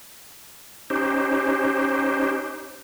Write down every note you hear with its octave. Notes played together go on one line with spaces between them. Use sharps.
C#4 D#4 G4 C5